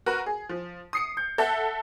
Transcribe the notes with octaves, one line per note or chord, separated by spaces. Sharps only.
F#4 A#4 B4
G#4
F3
D#6 C7 C#7
G6
A4 E5 F#5